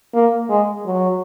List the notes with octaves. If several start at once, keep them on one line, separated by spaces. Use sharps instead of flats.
A#3
G#3
F#3